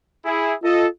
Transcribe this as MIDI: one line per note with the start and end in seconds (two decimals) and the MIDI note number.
0.24 0.53 64
0.24 0.53 68
0.63 0.87 65
0.63 0.85 69
0.63 0.85 75